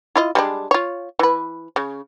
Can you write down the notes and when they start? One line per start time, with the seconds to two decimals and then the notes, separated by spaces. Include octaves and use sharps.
0.16 E4 F4 D#5
0.35 G3 G#3 D4
0.71 F4 C#5
1.19 E3 B4
1.76 C#3